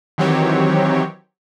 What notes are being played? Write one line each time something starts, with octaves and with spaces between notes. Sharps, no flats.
D#3 E3 F#3 C4 G4 C#5